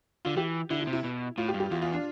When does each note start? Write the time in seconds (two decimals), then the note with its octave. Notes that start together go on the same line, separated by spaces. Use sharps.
0.25 D3 F4
0.37 E3 G4
0.70 D3 E4
0.82 E4
0.87 C3
0.93 E4
1.04 B2
1.38 A2 F4
1.48 G4
1.54 G2
1.60 G4
1.71 E2 F4
1.82 F4
1.93 D4